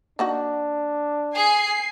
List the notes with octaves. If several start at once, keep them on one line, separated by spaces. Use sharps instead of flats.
A#3 D4 D#4 F#4
G#4 G#5 C7